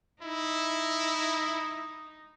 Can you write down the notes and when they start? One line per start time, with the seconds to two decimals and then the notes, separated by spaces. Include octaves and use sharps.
0.23 D#4 E4